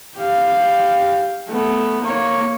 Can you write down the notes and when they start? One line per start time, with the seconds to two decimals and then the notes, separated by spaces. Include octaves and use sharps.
0.17 G4 F5
1.49 A3 B3
2.02 A#3 C#5